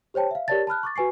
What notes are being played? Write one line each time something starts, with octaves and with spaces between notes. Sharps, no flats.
G4 C5 C#5 G5 A5
E5 F5
G4 A#4 C#5 D5 A5 A6
A5 B5 F6 F#6
C#6 D6 A6
F#4 B4 G#5 C#6 C7